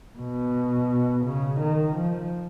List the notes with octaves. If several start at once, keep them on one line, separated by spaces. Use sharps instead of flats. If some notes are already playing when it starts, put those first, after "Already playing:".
B2
C#3
D#3
F3